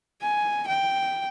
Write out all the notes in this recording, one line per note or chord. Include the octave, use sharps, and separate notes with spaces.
G#5
G5